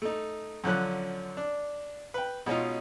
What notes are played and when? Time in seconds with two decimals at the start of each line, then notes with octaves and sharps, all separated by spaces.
0.02 A3 D#4
0.64 F#2 D3 F3 C#4 F#6
1.37 D4
2.14 B4 G5
2.46 B2 G#3 C#4 D#4 F4